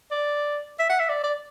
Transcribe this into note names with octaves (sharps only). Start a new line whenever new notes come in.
D5
E5
F#5
E5
D5
D5